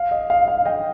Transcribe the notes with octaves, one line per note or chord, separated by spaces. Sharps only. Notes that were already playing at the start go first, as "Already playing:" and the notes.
Already playing: F5
D#5
F5
F5
D#5 G5